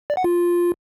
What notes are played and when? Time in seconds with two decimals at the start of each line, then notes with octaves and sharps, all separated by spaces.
0.10 D5
0.17 F#5
0.24 F4